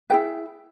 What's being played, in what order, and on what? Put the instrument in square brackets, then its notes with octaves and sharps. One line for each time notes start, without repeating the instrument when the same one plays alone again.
[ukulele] E4 G#4 B4 G5